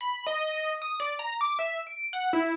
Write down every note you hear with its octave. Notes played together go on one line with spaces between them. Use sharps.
B5
D#5
D#6
D5
A#5
D6
E5
D7
F#5
E4